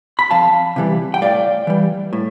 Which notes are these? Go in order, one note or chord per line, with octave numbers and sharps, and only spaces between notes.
B5
F2 F5 A5
C3 E3 G3
G5
A2 D5 F5
E3 G3
A2